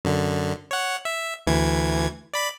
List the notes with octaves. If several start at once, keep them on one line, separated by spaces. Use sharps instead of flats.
F#2 D3
C#5 F#5
E5
D2 E3 G#6
D5 B5 B6